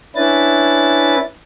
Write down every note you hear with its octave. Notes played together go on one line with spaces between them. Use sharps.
C#4 D4 E4 B4 A6